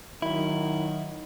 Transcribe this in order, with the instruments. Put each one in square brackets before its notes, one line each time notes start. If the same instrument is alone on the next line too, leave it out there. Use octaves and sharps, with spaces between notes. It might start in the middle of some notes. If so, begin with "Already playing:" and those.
[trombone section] D#3 F#3 [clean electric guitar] E4